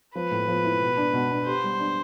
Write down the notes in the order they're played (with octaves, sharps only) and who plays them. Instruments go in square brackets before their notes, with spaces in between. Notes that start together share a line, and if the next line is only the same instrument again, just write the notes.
[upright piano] F3 [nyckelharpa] B4
[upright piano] A2
F3
E4
B2
D4
B2
D4
[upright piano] G4 [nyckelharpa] C5
[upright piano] G3
D4